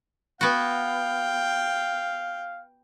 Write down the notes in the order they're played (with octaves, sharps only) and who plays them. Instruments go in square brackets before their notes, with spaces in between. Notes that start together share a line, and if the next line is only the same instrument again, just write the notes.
[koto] B3 F#4 [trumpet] F5 [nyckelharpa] G5